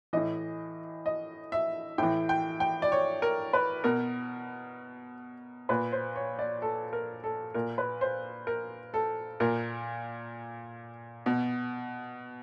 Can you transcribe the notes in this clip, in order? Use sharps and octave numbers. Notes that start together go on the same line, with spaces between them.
A2 E3 D#5
D#5
E5
A2 E3 G5
G5
G5
D5
C#5
A#4
B4
B2 A#4
A#2 B4
C5
C#5
D5
A4
A#4
A4
A#2 A#4
B4
C5
A#4
A4
A#2 A#4
B2